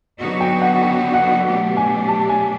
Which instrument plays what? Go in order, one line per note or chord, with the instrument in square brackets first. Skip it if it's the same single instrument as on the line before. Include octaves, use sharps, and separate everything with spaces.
[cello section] D3 F#3 B3 D#4 F#4
[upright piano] G5
F#5
G5
F#5
[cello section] B2 F#3 A3 D4 G4
[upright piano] G#5
A5
G#5